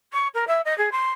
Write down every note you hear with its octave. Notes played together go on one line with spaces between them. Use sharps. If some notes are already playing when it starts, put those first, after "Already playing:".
C#6
A#4
E5
D#5
G#4
C6